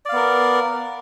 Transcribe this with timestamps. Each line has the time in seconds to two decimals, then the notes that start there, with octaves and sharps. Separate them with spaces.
0.05 D5
0.09 F5
0.12 B3
0.16 A#4